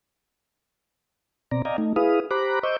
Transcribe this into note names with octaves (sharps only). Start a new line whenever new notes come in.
B2 C4 D5 A#5
D5 D#5 F5 G5 G#5 A#5
A3 D#4
E4 G#4 B4 F5 D#6
G4 C5 A#5 B5 D6 F#6
C5 D#5 C#6 D6 E6 G6